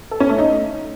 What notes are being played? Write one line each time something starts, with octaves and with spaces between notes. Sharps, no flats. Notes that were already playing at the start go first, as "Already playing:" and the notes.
A4
C#4
A3
D#4